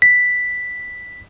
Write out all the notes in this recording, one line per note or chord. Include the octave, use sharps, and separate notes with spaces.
B6